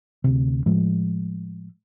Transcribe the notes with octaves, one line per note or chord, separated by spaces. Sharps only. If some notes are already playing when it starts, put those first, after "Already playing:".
D2 C3
A2 F3 G#3